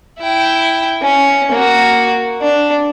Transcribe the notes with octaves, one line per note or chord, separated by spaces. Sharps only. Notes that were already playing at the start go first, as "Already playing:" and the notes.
E4 G5
C#4
A#3 F#4
D4